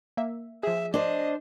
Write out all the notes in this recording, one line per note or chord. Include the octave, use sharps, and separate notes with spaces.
A#3 E5
F3 G#4 E5
D4 C5 D#5